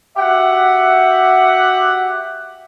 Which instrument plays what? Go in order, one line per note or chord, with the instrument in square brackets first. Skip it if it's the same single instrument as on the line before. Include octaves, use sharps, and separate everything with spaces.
[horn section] F#4 G4 E5 F#5